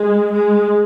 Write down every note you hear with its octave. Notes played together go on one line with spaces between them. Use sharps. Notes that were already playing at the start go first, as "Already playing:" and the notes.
Already playing: G#3
G#3